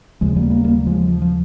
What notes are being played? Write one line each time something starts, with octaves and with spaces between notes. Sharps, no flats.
D#2 C#3 F3 G#3
G3 A#3
G3 A#3
G3 A#3
F3 G#3
F3
F3